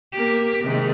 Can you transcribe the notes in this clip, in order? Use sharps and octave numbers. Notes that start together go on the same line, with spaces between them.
A#3 G4
G#2 C3 D#3